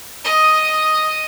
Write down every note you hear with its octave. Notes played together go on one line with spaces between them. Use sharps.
D#5 D#6